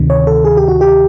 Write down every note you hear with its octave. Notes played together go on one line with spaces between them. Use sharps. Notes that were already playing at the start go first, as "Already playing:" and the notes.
Already playing: D2 C3 D#3
C#5
A4
G#4
G4
F#4
G4